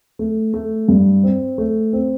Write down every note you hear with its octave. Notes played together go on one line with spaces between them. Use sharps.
A3
A3
G2
C4
A3
C4